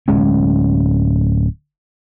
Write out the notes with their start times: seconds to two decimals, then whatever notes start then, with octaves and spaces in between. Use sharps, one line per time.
0.08 D1 G#3 C#4